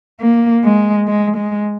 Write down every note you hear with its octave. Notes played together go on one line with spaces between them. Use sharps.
A#3
G#3
G#3
G#3